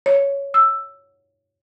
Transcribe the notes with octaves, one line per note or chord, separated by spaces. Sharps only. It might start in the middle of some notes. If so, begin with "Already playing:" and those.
C#5
E6